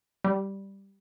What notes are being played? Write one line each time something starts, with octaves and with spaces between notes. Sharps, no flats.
G3